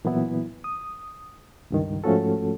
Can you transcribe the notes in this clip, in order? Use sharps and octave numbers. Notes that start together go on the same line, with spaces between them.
A#2 E3 F#3 B3 E4
D#6
C#2 G2 D#3
G#2 F3 A3 C#4 F#4 A4